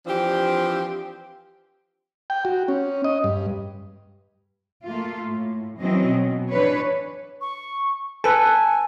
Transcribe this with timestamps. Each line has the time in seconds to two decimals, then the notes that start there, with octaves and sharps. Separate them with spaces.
0.06 E3 F3 C4 D4 G4
2.30 G5
2.45 F#4
2.68 C#4
3.04 D#5
3.24 G2
4.85 A3 A#3 F4
5.27 A2
5.80 E3 F#3 C4 C#4 D#5
6.09 B2
6.50 E3 D4 B4 C#5
7.41 C#6
8.24 A4 B4 G#5 A5